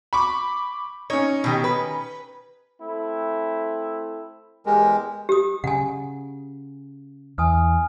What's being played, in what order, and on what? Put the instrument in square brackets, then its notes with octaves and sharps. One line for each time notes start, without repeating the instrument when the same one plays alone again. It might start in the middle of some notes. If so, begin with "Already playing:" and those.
[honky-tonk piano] B5 C#6 D6
[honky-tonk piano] C#4 D#4 [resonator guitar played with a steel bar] C#5
[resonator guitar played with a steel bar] B2 D#3 G4
B4
[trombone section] A3 C4 E4
[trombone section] E2 G4 A#4 [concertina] G#3
[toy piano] G4 D#6
[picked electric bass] C#3 [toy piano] F#5 G#5
[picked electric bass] E2 [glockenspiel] G#5 D#6 F6